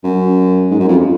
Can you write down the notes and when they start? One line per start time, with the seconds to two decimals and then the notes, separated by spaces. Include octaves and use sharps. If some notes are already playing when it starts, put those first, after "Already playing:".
0.04 F#2
0.71 G#2
0.80 F#2
0.88 F2